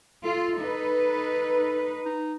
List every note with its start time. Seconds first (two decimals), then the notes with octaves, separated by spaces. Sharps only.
0.25 F4 A4
0.59 D#4 B4
2.06 D#4